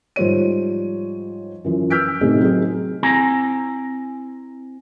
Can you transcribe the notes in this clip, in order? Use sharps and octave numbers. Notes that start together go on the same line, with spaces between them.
G#2 F3 G3 C5 C#5 D#7
F#2 E3 F3
E6 F6 G6 B6 D7
A2 C3 A3 D#4 G4 G#4
F#3 C4 D#4 G#4
C4 E4 G#5 A#5